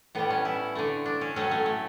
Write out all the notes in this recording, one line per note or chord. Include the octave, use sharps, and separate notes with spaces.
A2 G3 B3
C#4
E4
D3 A3
D4
C#4
A2 F#3 A3 C#4
A3
A3